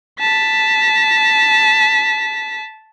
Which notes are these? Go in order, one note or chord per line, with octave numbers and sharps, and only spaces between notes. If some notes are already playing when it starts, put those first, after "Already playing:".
A5 B6